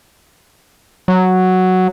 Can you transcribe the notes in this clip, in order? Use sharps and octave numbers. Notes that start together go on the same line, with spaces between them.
F#3